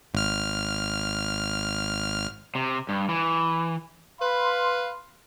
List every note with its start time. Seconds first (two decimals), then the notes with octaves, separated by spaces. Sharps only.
0.14 G#1 F6
2.55 C3
2.89 G2
3.09 E3
4.21 B4 F5 B5 C6